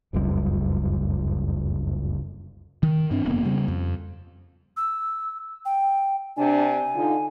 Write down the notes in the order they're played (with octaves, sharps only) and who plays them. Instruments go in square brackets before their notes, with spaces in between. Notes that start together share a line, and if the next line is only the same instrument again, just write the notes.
[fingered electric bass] F1 C#2 F#2 G3
D#3
G2 C4 D4
F1 A#3 B3
C#3 G3
F2
[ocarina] E6
G5
[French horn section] C3 D4 [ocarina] G#5
[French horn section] D3 D#4 F4